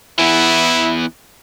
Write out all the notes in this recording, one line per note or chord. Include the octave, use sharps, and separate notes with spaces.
E3 B3 E4